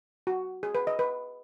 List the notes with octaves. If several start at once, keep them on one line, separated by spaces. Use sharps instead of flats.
F#4
G#4
B4
D#5
B4